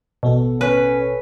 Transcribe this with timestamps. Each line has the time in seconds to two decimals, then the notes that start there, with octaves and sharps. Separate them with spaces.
0.23 A1 B2 B3 A4
0.61 C#4 B4